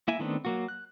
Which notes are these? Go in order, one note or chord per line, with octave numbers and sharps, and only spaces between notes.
A#3 E4 E5 G#5
D#3 A3 B3 C4 D4
F#3 A#3 F#4
F#6